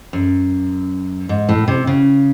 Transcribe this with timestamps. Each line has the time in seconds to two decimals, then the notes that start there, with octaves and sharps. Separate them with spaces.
0.13 F#2
1.29 G#2
1.49 A2
1.68 C3
1.87 C#3